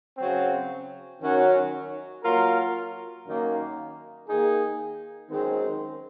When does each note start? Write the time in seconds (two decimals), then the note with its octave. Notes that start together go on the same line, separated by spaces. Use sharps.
0.18 C#3 F#3 C4
1.21 F#2 D#3 F#3 C#4 F#4
2.23 F#3 A#3 F4 A#4
3.26 F#2 D#3 A#3
4.28 D#3 A#3 D#4 G#4
5.30 F#2 D#3 G#3 C4